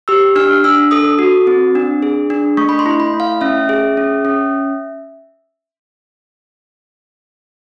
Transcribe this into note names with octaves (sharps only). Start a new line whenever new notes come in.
G4 E6
D4 F6
D4 E6
A4 D#6
F#4
C4
D4
G#4
D4
A3 C#6
B5
C6
E4
B5
A3
F5
C#4 E5
G#4
C#4
C#4